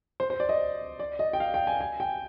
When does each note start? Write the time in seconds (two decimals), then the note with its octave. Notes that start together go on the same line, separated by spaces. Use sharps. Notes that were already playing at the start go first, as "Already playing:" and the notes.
0.20 C5
0.30 C5
0.40 D5
0.49 D#5
0.99 D5
1.19 D#5
1.33 G5
1.40 F5
1.54 G5
1.67 G#5
1.81 G#5
2.00 G5